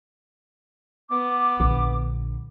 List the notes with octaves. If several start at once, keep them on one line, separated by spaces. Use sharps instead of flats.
B3 D6
A#1 D3